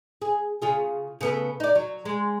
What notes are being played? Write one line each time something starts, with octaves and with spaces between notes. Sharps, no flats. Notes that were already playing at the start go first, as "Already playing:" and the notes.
G#4
C#3 F4 G#4
C#3 B3 A4
D#4 D5
F#3
G#3